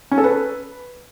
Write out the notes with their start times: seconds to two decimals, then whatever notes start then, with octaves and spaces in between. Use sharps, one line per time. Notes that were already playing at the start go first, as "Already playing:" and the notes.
0.11 C#4
0.18 A4
0.24 B4